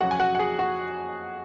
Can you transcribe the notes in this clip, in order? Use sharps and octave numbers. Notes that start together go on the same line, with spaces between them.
F2 C#3 F#3 F#4 F#5
G#5
F#4 F#5
F#5
G#4 G#5
F#4 F#5